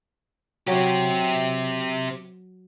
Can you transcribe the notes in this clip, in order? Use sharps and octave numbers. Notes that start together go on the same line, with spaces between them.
F#3 C4 G4